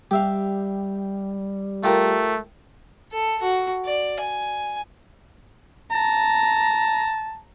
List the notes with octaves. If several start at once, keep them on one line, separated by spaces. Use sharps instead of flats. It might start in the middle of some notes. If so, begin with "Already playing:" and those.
G3 G4 E5 F5
A3 F4 G4 A#4
A4
F#4
D5
G#5
A5 A#5